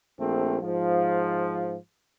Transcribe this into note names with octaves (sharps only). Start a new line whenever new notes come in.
A#1 A3 C4
G#2 F3